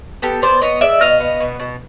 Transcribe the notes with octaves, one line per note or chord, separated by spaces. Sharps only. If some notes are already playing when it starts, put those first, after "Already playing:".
B3 G4 A4
B3 C5 D5
B3 C#5 D#5
G#3 D5 E5
B2 D#5 F5
B3
B2
B2